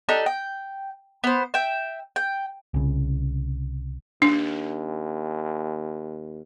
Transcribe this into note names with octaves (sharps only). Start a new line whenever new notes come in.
D4 D#4 G4 A4
G5
B3 C5
E5 G5
G5
C2 C#3
D#2 D4